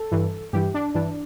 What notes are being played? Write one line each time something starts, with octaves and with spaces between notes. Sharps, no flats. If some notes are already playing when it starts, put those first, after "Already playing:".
Already playing: A4
G2 E3
G2 E3 G4
D4
G2 E3 D4